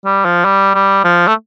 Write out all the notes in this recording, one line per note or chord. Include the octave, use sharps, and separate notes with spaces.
G3
F3
G3
G3
F3
A3